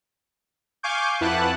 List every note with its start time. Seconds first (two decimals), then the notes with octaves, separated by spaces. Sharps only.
0.83 F5 G#5 C#6 D6 G6
1.21 F2 E4 B4 F#5 A5 F#6